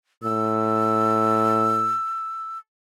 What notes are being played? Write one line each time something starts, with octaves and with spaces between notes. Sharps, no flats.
A2 E6